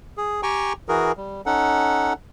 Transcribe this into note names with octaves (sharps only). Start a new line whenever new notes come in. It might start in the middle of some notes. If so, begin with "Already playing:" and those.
G#4
G4 G5 G#5 A#5 C#6
E3 F#4 G#4 A#4
G3
C#4 D#4 A4 F#5